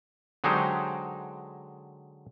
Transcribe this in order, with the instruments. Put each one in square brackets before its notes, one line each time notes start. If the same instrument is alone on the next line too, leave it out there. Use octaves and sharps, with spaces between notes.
[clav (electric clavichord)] D3 F#3 G#3 D#4 G4 C5